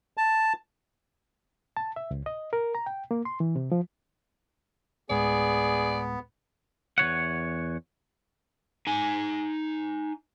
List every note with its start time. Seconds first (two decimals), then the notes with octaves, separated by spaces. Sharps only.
0.17 A5
1.77 A5
1.96 E5
2.11 C#2
2.26 D#5
2.53 A#4
2.75 A#5
2.86 G5
3.11 A#3
3.25 C6
3.40 E3
3.56 C3
3.72 F3
5.10 D2 A2 G#3 B3 G#4 D5
6.98 E2 F3 C#5 F#5
8.87 D#4 G#5